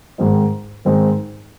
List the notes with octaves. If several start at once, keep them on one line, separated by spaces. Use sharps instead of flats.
G#2 D#3 G#3 C4 D#4
G#2 D#3 G#3 C4 D#4